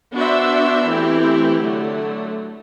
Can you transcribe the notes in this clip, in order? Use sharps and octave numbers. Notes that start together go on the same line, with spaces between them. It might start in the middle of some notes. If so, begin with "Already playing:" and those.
B3 D4 F#4 C5 E5
E3 A3 C4 E4 G4
D3 F#3 A3